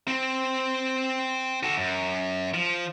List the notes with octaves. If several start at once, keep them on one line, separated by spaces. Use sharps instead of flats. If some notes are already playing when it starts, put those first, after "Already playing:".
C4
F#4 A4
F#2
F3